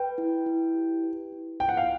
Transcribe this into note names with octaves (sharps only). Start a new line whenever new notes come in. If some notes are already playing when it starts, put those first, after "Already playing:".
Already playing: B4 G5
E4
E4
G4
B4
E4
F4 G5
F#5
F5